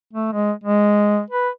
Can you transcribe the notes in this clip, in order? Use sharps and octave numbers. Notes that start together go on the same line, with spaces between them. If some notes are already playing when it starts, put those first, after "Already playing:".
A3
G#3
G#3
B4